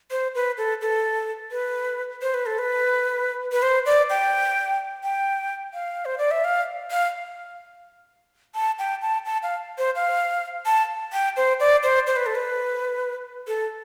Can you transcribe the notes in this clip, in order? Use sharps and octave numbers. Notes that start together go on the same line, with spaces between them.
C5
B4
A4
A4
B4
C5
B4
A4
B4
B4
C5
D5
G5
G5
F5
C5
D5
E5
F5
F5
A5
G5
A5
A5
F5
C5
F5
A5
G5
C5
D5
C5
C5
B4
A4
B4
A4